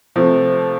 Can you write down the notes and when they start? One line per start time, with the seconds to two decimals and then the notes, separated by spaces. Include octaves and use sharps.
0.16 C3 F3 A3